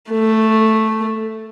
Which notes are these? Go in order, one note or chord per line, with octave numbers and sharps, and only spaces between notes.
A3